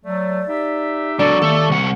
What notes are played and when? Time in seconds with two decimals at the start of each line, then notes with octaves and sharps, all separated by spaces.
0.05 F#3 A3 D5
0.48 D#4 G4 E5
1.19 F#3 D4 A4 D5 C#6
1.42 D#2 A4 E5
1.69 C2 F#5